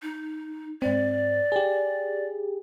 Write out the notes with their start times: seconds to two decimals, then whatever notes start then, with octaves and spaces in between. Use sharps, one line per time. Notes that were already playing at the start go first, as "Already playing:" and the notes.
0.02 D#4
0.82 G#2 C4 D5
1.52 G4 G#4